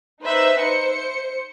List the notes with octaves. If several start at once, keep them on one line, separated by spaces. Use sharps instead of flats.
D#4 B4 C5 E5
C5 C#7